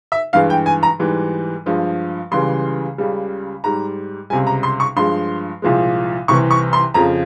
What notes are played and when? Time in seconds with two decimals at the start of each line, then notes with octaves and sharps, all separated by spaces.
0.12 E5
0.33 G2 E3 G#3 F5
0.50 G5
0.66 G#5
0.83 A#5
0.99 G#2 E3 G3
1.66 G2 F3 G#3
2.31 C#2 C#3 E3 G3 C6
2.98 C#2 C#3 G3
3.64 G#2 G3 A#5
4.30 C#2 C3 G3 G#5
4.47 A#5
4.63 C6
4.80 C#6
4.96 G2 F3 G#3 C6
5.62 C2 A#2 F3 G#3
6.28 C2 C3 E3 C#6
6.51 C#6
6.73 C6
6.94 F2 C#3 F3 A#5